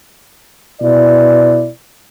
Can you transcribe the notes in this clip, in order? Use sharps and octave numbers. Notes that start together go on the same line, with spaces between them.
B2 E4 D5